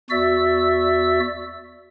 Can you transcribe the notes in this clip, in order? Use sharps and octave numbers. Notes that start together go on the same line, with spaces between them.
E2 F#4 D5 E5 E6